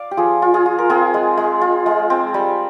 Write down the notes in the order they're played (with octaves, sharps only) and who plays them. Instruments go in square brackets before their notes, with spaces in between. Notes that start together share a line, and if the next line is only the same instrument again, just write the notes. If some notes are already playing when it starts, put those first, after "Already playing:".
Already playing: [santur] D5 F5
G4
F3 F4 G#4
F4
F4 G#4
F4
A#4
C4 F4 G#4
G#3
G#3
F4
G#3
C4
G3